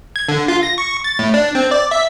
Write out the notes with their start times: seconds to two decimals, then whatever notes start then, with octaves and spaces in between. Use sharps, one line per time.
0.16 G#6
0.28 D3
0.48 F4
0.63 A#6
0.78 C#6
1.04 A6
1.19 A2
1.34 D4
1.55 C4
1.71 D5
1.91 E5